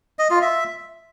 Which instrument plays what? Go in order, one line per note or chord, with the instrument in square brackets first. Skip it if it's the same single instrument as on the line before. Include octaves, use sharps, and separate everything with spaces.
[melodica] D#5
F4
E5